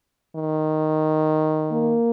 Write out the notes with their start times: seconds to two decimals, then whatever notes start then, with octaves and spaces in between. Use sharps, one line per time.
0.36 D#3
1.73 A#3